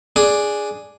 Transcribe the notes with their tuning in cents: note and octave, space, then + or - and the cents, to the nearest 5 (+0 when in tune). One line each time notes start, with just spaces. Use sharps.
D4 +0 G#4 +0